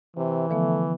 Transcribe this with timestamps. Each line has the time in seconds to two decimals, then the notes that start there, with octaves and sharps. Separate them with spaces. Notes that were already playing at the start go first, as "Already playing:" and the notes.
0.16 C3 E3
0.50 D3 F3 A3 B3